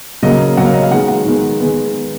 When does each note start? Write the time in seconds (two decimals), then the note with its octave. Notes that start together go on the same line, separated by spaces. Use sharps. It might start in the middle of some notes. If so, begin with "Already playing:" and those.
0.23 C#3 F#3 A#3 D#5
0.57 C#3 F#3 A#3 F#5
0.65 F5
0.74 D#5
0.83 F5
0.91 D#3 G#3 B3 F#5
1.08 F#5
1.25 D#3 G#3 B3
1.60 D#3 G#3 B3